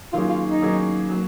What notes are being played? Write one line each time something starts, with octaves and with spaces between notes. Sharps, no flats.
D#3 F#3 A#3 C#4 F4 G#4
F4
D#4
D#3 F#3 A#3 C#4 G#4
F#3 A#3